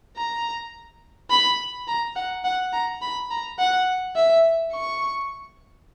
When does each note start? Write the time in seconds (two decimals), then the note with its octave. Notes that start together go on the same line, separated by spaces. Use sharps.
0.17 A#5
1.30 B5
1.88 A#5
2.15 F#5
2.44 F#5
2.72 A#5
3.01 B5
3.30 A#5
3.59 F#5
4.16 E5
4.73 C#6